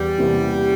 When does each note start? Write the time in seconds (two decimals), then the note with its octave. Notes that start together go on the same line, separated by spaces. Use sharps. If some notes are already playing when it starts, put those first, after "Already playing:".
Already playing: E2 G3
0.18 C3 E3 A#3